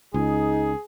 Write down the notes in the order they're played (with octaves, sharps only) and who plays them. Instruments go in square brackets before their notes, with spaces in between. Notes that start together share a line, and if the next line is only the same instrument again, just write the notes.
[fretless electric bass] C#2 [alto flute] D#4 [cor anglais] G#4